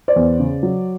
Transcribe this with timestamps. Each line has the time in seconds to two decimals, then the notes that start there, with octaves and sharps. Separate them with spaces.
0.08 C5 D5
0.16 E2
0.39 C#3
0.63 F#3